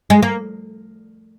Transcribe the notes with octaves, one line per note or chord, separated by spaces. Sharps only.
G#3
A#3